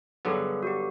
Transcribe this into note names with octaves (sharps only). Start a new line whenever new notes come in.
G2 D3 F#3 B3 G#4
F#4
G4